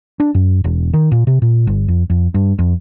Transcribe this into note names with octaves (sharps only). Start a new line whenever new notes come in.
D4
F#2
E1
D#3
A#2
C3
A#2
G1
F2
F2
G2
F2